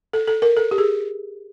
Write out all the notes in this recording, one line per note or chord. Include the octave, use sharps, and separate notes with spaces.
A4
A4
A#4
A4
G4
G#4